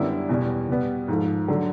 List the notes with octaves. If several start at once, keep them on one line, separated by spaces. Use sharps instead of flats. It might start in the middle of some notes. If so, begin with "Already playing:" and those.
Already playing: F#2 D3 G3 B3 E4
E2 B2 G3
B2 G3 B3
G#2 F3 A3
D3 F#3 A3